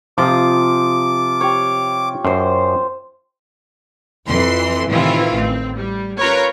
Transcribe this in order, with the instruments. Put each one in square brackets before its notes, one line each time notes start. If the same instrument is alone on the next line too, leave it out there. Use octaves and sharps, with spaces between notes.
[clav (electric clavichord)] C3 F3 [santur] F4 D#6 [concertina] D6
[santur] G4 C#5
[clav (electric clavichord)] F#2 [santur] C5 C6
[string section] F2 E3 C6
A2 C3 D#3 E3 E4 F4
A1 C4
G3
C#4 F4 A#4 B4 C#5